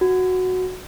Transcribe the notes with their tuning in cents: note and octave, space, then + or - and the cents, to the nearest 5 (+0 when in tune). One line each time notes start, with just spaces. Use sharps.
F#4 -5